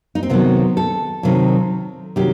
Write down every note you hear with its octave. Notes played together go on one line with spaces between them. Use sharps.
D#4
C4
C3 D#3 F#3 B3
A4
C3 D#3 F#3
C3 D#3 F#3 G4